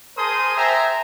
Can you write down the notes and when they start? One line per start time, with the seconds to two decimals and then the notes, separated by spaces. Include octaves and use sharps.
0.18 G#4 A#4 C5 A5 C6 D#6
0.58 C5 E5 G5 G#5 A#5